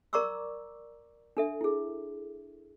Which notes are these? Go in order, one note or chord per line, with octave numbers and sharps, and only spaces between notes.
A#4 D5 A#5 C#6 D6 E6
D4 A4 E5
E4 G#4